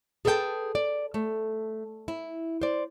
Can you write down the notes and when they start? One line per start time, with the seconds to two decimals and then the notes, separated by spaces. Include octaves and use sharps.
0.25 G#4 A4 B4 E5 G5 A5
0.75 D5
1.14 A3
2.08 E4
2.62 C5 D5